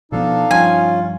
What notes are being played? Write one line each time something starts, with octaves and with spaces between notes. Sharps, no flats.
B2 F3 B3 D4 D#4 A4 F5
G2 F3 C#4 F4 G#5